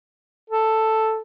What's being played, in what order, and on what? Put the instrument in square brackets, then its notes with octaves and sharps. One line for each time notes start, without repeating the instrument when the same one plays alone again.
[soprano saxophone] A4